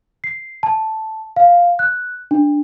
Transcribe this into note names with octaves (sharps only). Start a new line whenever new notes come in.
C7
A5
F5
F#6
D4